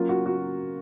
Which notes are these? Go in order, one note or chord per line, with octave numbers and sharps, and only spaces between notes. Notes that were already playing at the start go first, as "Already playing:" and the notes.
Already playing: F#3 A#3 C#4 F4
F#4
F#4